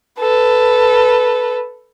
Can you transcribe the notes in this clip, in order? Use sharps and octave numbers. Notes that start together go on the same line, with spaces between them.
A4 B4